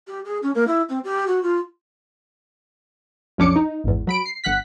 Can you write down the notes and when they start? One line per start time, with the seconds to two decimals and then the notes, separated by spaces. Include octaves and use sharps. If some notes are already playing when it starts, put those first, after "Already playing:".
0.07 G4
0.25 G#4
0.43 C#4
0.55 A#3
0.67 E4
0.89 C4
1.04 G4
1.27 F#4
1.43 F4
3.38 B1 F2 C#4 D4 D6 C#7
3.56 D#4
3.84 G#1 E2
4.07 F#3 B5 D7
4.25 C7
4.44 G1 F#5 F#6 B6